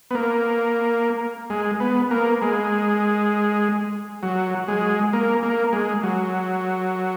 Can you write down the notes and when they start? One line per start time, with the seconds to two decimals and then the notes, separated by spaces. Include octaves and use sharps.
0.11 B3
0.15 A#3
1.50 G#3
1.80 B3
2.11 A#3
2.42 G#3
4.23 F#3
4.68 G#3
5.13 A#3
5.43 A#3
5.73 G#3
6.03 F#3